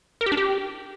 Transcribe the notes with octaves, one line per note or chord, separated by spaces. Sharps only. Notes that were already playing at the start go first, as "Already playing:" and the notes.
A#4
G4
D4
G4